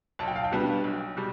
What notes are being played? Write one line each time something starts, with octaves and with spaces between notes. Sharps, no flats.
B1 A5
G5
F5
G5
B2 G3 B3 D4
B1
B2 G3